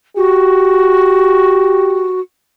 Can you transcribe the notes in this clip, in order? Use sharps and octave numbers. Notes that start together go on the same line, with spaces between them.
F#4 G4